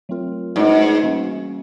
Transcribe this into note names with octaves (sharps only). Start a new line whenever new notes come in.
F#3 A3 C4 F4 A#4
G#2 A3 D4 F#4 B4 D5
E3 G3 A#3 C#4 F#4